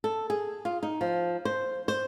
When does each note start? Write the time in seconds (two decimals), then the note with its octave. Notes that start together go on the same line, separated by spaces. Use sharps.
0.04 A4
0.30 G#4
0.65 F4
0.83 D#4
1.01 F3
1.45 C5
1.88 C5